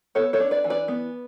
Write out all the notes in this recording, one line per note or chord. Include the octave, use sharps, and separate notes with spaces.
B3 A4 C#5
A4 C#5
D4
B4 D5
E3
B4 D5
B3